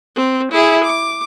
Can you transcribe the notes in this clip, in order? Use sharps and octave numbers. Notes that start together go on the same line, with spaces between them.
C4
E4 G#4
D6